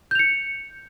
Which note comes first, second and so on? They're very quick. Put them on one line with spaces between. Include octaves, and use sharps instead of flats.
G6 F7 C#7